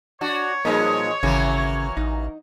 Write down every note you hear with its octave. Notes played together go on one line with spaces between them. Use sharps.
D4 F#4 C#5
A#2 F3 G3 G#3 A#3 D#4
G#1 C#3 E3 F#3 A#3
A1 D#4